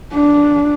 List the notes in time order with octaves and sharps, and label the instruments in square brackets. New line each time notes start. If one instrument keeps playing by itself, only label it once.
[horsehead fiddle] D4